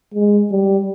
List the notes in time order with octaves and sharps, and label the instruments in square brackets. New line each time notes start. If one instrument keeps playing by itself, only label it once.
[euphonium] G#3
G3